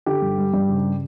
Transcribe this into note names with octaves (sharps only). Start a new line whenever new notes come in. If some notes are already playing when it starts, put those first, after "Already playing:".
D3 G4
G2
G3
G2
C#3